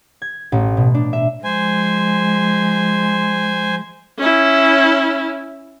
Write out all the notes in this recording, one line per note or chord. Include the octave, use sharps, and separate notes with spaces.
G#6
A1
B2
D4
E5
F3 G#3 C5 G#5
C#4 E4